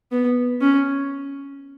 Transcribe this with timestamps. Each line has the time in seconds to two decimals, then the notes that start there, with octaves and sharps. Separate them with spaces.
0.12 B3
0.61 C#4